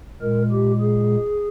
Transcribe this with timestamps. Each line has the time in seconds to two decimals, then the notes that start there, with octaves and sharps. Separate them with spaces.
0.22 A#2 G#3 A#4
0.51 G4
0.81 G#4